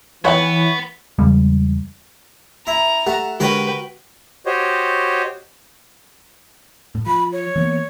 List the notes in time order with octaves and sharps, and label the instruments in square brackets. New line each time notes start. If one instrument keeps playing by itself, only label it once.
[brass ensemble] E3 [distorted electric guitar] B3 [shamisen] B4 F#5 G5 [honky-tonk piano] C#5
[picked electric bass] E2 C#3 G3 G#3
[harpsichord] E4 [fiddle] A#5
[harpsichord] A3 [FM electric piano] G4 F#5
[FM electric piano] D3 G#3 G4 [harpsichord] F#4 A#4 C#5 [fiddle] B4 G5
[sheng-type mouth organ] F#4 G4 C5 C#5 D#5
[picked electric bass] A2
[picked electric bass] F3 [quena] B5
[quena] C#5
[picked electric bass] E3 A#3 B3